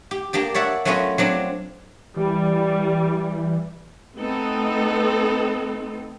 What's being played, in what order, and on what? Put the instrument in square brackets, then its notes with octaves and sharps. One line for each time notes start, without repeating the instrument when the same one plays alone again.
[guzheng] G4
A#3 D4 G4 D5
C#5 D5 E5 F#5
F#3 A3 B3 C#4 F4 D#5
F#3 C4 D4 F4
[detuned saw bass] E3 [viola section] G3
[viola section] A3 B3 C4 D#4 A4